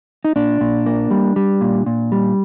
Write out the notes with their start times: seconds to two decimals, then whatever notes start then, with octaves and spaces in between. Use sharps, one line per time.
0.24 D#4
0.36 A#2 D4
0.61 A#2
0.86 A#3
1.11 G3
1.36 G3
1.61 A#2
1.86 A#2
2.12 G3